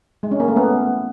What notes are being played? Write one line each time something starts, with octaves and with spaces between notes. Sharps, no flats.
G#3
C#4
A#3
A3
B3